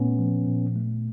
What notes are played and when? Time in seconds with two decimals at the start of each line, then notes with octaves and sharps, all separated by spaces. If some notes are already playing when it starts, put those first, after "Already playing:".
Already playing: A#2 A3 B3 C#4
0.19 F3
0.47 A#2
0.76 A3